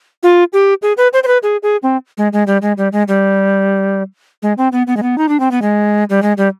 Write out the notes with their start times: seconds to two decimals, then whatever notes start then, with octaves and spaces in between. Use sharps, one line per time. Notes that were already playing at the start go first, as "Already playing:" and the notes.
0.23 F4
0.53 G4
0.82 G#4
0.97 B4
1.13 C5
1.23 C5
1.27 B4
1.43 G#4
1.63 G#4
1.83 C4
2.18 G#3
2.33 G#3
2.47 G3
2.62 G#3
2.78 G3
2.92 G#3
3.08 G3
4.43 G#3
4.58 C4
4.72 B3
4.87 B3
4.97 G#3
5.03 B3
5.18 D#4
5.29 D4
5.40 C4
5.51 B3
5.62 G#3
6.10 G3
6.22 G#3
6.38 G3